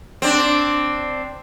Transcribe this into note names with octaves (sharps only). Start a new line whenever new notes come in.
C4 D4